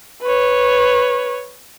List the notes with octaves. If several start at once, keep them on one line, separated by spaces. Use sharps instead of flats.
B4 C#5